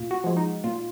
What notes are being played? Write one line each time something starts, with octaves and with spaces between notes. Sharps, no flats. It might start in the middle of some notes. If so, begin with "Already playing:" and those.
Already playing: A#2 F4
F#4
F3 G#3
D#4
A#2 F4